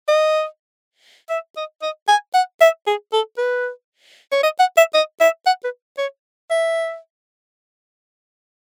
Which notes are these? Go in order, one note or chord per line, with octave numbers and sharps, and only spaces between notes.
D#5
E5
D#5
D#5
G#5
F#5
E5
G#4
A4
B4
C#5
D#5
F#5
E5
D#5
E5
F#5
B4
C#5
E5